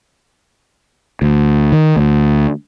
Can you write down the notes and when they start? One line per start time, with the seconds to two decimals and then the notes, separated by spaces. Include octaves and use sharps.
1.22 D2
1.72 D#3
1.97 D2